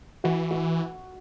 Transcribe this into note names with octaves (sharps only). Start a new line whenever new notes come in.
E3 F#4
F#4